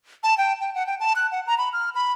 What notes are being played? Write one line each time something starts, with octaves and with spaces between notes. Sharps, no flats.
A5
G5
G5
F#5
G5
A5
F#6
F#5
A#5
B5
F6
B5